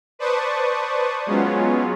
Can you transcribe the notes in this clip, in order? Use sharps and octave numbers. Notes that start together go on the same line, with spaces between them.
B4 C5 D5 A5 C#6 D#6
F#3 G#3 B3 C#4 F4